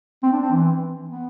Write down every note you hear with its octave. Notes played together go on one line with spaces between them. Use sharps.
C4
D4
C4
E3
B3